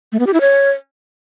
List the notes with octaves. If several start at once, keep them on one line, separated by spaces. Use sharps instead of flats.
A3
B3
G4
E4
C#5